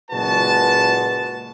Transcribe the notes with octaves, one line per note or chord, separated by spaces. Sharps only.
F#1 A#2 G#3 F#4 B4 A5